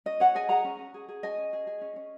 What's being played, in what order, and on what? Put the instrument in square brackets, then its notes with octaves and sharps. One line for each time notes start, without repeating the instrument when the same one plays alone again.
[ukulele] C#4 D#5
C#4 C#5 F#5
G#4 D#5 G#5
G#4 F#5 A#5
C#4
C#4
G#4
G#4
C#4 D#5 G#5
C#4
G#4
G#4
C#4
C#4